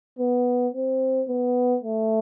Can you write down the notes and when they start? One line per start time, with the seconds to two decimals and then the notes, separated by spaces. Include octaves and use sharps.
0.19 B3
0.74 C4
1.29 B3
1.84 A3